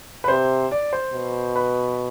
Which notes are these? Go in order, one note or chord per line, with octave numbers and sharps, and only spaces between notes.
B4
C3 C5
D5
C5
B2
B4